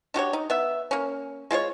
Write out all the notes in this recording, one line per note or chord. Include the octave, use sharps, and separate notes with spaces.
D4 F#4 G4 C#5
D#4
B3 E5
A#3 C#4
G#3 F4 C5 C#5